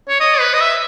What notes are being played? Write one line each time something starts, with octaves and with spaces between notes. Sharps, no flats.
C#5
D#5
B4
D#5
E5